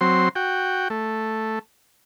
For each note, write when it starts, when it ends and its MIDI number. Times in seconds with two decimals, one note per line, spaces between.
0.01 0.29 54
0.01 0.29 60
0.01 0.29 84
0.35 0.88 66
0.35 0.88 79
0.90 1.59 57